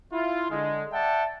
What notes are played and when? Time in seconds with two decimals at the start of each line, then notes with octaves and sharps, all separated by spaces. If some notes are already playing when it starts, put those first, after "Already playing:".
0.13 E4 F4
0.51 D3 G#3
0.93 D5 E5 F#5 G5 A5